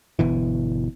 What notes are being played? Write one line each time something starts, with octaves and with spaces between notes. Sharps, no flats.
G1 B2 E3